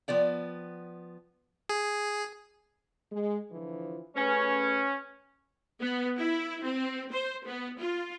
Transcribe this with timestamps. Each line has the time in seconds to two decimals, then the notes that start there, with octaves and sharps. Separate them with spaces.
0.08 F3 B3 D5 G5
1.69 G#4
3.12 G#3
3.51 D3 E3 F3
4.16 A3 C#4 G#4 B4
5.81 B3
6.18 E4
6.64 C4
7.12 C5
7.47 B3
7.78 F4